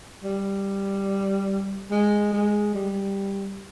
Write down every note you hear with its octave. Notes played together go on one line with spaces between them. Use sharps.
G3
G#3
G#3
G3